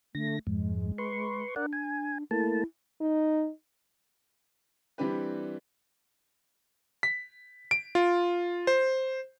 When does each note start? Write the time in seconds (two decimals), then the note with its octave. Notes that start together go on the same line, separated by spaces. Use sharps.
0.15 D3 A3 A#6
0.47 F2 G#2 G#3
0.98 B4 C6 C#6
1.56 D4 A#4 D5 F#5
1.73 G#5
2.31 A3 A#3 E4 A5
3.01 D#4
4.98 E3 G3 C4 D4 G4 B4
7.03 B6
7.71 D7
7.95 F4
8.67 C5